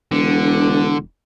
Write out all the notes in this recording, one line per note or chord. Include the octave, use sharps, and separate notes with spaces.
E1 D3